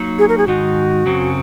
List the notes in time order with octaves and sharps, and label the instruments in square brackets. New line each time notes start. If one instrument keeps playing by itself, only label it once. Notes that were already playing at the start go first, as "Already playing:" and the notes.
Already playing: [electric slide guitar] F#3 A#3 D#4
[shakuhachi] G#4
A#4
G#4
[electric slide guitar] G#2 D#3 G#3 D#4 [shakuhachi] F#4
[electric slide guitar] F#2 C#3 F#3 C4